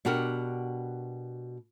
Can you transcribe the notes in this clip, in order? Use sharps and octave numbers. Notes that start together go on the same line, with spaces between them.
B2 D4 F#4 G4 A#4